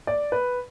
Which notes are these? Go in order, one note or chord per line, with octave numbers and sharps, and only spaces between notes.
D5
B4